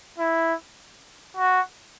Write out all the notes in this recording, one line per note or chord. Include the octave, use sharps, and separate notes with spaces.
E4
F#4